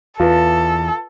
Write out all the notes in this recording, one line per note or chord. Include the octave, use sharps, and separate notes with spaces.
E2 F4 A4 B4